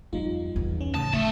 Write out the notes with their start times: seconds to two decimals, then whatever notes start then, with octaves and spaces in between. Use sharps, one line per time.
0.13 F2 G3 D#4 F4
0.56 E2
0.81 C#4
0.95 A2 C#3 A5 D#6
1.13 D3 A3